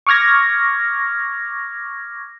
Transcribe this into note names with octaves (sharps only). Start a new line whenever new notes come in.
C#6 D6 F6 G#6 A#6